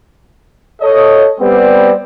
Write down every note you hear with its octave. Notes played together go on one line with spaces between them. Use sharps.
A4 C#5 D#5
G3 B3 C4